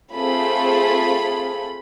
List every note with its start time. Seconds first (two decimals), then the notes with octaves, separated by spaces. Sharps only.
0.13 A3 C4 F4 G#4 B5